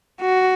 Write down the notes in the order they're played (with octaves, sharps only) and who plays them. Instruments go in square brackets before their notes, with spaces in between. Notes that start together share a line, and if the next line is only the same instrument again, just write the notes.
[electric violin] F#4